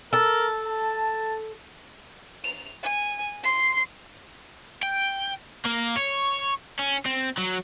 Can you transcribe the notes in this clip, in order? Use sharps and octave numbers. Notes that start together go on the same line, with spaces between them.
A4 A#4
A5
F7
G#5
C6 C7
G5
A#3
C#5
C#4
C4
F#3